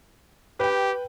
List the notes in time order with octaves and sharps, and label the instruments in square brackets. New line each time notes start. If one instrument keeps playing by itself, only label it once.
[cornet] G4 [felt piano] B4 G5